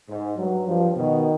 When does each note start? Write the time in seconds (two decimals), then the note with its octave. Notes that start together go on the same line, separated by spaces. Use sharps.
0.08 G#2
0.37 G2 F#3
0.66 G2 F3
0.95 B2 D#3